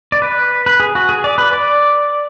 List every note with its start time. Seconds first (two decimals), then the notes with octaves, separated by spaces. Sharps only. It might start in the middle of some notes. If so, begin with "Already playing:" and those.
0.12 D5
0.22 B4
0.66 B4
0.80 G#4
0.95 F#4
1.09 G#4
1.24 D5
1.38 B4
1.53 D5